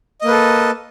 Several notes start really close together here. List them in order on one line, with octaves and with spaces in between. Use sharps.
D#5 A#3 B4 A4